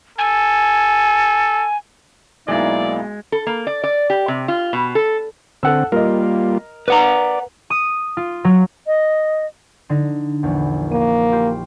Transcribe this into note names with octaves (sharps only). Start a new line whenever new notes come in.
A4 G#5
B1 G#3 A#3 D#4 E4 D5 E5 A6
A4
A#3
D5
D5
G4
C3
F4
B2
A4
D3 C4 A4 F#5 E6
G3 A#3 F4 A#4 D#5
B4 D5 F#5 A#5
D#6
F4
F#3
D#5
D3 D#4 A#6
A#1 E2
A#3 D#7
F4 G4